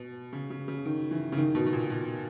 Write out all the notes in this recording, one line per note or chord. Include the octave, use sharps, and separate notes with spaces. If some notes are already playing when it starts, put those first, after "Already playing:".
Already playing: B2
C#3
C#3
C#3
D#3
E3
C#3
D#3
B2
B2
A#2
B2